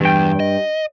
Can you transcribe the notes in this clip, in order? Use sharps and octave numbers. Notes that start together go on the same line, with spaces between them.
E2 G2 G5
D#5